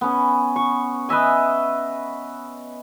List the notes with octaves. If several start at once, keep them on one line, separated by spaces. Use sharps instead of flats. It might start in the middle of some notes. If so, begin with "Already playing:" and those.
B3 C#4
C#6
B4 D#5 E5 G#5